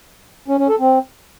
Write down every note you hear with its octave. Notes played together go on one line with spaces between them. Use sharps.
C#4
C#4
A4
C4